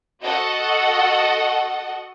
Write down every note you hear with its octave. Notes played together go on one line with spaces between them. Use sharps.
F#4 A4 D#5 F#5